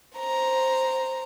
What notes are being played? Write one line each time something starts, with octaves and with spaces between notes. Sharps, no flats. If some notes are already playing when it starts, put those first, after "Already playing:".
C5 A#5